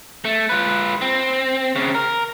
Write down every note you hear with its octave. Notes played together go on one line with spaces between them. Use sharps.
A3
F4 B4
C4
C#3 C4
A#4